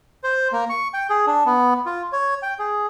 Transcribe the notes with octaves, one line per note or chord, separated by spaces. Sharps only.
C5
A#3
C#6
G5
G#4
D4
B3
F4
C#5
G5
G#4